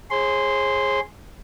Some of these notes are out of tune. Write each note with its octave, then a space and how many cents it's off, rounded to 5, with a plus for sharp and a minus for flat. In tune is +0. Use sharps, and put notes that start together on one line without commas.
G#4 +0 C#5 -45 C6 -10